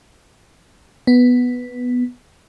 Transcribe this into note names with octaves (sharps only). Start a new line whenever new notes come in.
B3